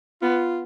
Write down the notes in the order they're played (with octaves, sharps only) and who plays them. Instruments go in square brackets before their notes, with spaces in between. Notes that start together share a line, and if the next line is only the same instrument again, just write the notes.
[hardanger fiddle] B3 [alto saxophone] F4